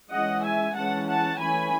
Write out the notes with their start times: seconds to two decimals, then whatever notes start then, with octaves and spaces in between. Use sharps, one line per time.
0.12 E3 G#3 C#4 D#5 F#5
0.44 E5 G#5
0.76 E3 G#3 C#4 F#5 A5
1.08 F#5 A5
1.40 E3 A3 C#4 G#5 B5